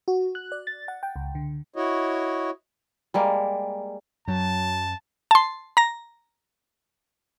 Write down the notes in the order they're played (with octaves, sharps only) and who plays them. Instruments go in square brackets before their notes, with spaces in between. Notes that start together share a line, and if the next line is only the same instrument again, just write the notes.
[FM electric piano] F#4
F#6
D5
A6
F#5
G5
C#2
D3
[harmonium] E4 F#4 C#5 D#5
[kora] G3 G#3 A#3
[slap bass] F#2 [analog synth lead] F#3 [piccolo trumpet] A5
[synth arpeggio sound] A5 C6
A#5 A#6